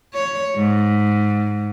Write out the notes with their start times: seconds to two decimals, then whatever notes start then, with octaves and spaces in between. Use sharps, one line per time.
0.14 C#5
0.56 G#2